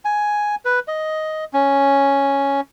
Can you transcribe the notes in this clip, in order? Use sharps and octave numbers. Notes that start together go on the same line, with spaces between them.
G#5
B4
D#5
C#4